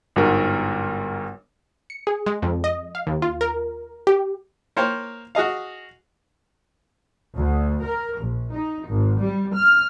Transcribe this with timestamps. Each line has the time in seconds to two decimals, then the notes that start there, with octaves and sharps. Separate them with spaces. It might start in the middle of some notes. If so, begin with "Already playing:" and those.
0.16 G1 G#2 F#4 A#4
1.90 C#7
2.07 G#4
2.26 G#3
2.42 F2
2.64 D#5
2.95 F5
3.07 D#2
3.22 F4
3.41 A#4
4.07 G4
4.76 A#3 C5 C#5 F5 G5
5.35 F#4 G#4 D#5 F5
7.36 D2
7.83 A#4
8.19 A#1
8.52 D#4
8.88 G#1
9.22 G3
9.55 F6